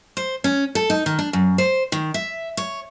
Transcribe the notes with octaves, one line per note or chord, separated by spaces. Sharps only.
C5
C#4
A4
D#4
D#3
D4
F#2
C5
D#3
E5
C#5